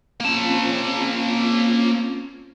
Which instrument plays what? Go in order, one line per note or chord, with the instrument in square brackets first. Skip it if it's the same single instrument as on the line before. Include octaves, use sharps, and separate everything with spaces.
[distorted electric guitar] A#3 A5 [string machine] C4 C#4 F4